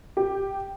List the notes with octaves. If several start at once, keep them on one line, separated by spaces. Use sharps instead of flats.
G4